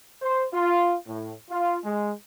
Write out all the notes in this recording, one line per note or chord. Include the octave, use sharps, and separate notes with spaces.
C5
F4
A2
F4
G#3